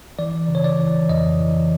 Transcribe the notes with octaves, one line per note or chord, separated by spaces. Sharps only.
E3 D5
C#3
C#5
D5
E3
F2 D#5
E3